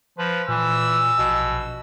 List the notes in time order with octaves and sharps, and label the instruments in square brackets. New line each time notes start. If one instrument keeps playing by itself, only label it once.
[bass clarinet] F3 [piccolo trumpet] B4
[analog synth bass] A#2 [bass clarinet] E3 [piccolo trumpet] E6
[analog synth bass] A#1 [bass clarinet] B2